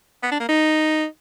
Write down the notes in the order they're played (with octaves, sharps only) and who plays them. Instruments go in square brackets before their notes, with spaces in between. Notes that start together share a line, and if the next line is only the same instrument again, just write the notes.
[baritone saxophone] B3
D4
A#3
D#4